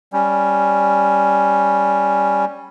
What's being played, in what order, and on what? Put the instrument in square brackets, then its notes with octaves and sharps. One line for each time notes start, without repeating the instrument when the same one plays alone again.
[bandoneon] G3 C#4